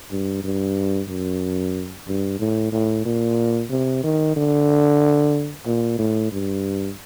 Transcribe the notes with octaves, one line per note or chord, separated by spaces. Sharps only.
G2
G2
F#2
G2
A2
A2
A#2
C3
D#3
D3
A#2
A2
G2